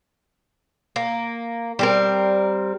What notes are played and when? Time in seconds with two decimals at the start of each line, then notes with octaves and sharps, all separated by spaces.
0.96 A#3
1.79 G3 C4 A#4